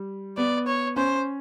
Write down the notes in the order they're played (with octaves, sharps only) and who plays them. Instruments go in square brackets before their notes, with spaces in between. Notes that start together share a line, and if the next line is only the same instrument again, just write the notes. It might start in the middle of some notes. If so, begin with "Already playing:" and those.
Already playing: [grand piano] G3
[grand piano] B3 [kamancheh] D5
[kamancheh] C#5
[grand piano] C#4 [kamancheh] C5